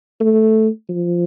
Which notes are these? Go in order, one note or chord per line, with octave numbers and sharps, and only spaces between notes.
A3
F3